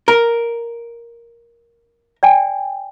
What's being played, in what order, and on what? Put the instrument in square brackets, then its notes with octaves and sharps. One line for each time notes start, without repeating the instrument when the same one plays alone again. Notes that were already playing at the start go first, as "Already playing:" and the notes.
[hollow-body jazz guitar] A#4
[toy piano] D5 G5 G#5